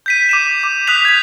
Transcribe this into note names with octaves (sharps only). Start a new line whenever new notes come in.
G6 B6 D#7
D6 D#7 E7
D6
D#6 F#6 G6 B6 F7
G#6 B6